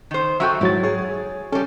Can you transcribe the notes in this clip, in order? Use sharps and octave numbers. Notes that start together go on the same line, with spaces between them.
D#3 C5
F#3 F#4 A4 E5 G5
G#2 F#3 E4 A6
G#4 C#5
G3 C#4 A4